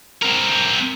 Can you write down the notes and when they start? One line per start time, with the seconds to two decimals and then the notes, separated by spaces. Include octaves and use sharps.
0.23 C4 A#4